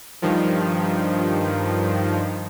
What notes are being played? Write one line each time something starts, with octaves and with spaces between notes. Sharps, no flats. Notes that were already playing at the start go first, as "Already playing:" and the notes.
G2 D#3 F3